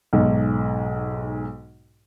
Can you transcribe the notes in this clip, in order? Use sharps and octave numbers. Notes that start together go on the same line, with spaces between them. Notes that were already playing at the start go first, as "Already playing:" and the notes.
B1 G#2